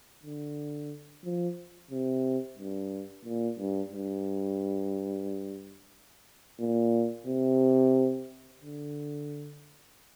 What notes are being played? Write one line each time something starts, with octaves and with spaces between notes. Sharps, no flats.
D3
F3
C3
G2
A#2
G2
G2
A#2
C3
D3